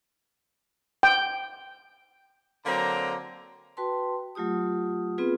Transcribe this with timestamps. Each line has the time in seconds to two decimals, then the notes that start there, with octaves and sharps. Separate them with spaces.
1.03 G5
2.66 D3 F#3 A#3 C4 A#5
3.77 F#4 B4 G5 A5 C6
4.35 F#3 A3 F4 G4 D#6
5.18 B3 C4 F4 G#4 B4